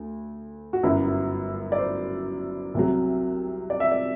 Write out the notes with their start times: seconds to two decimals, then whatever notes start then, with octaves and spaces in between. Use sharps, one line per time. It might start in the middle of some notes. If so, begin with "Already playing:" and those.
Already playing: D2
0.73 F#4
0.83 G1 F#2 F#3 E4
1.72 D5
1.78 C5
2.74 C2 C3 F#3
3.70 D5
3.80 E5
3.91 D5